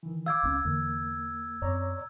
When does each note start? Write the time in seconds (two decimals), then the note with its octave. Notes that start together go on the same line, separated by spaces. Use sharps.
0.03 D#3 E3
0.26 F5 D6 E6 G#6
0.43 C#2 C4 C#4
0.65 E2 D3 E3 A#3
1.62 F#2 C4 C#5 D5 A#5